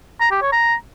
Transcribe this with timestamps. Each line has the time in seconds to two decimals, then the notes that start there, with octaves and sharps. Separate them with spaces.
0.20 A#5
0.31 G4
0.42 C#5
0.52 A#5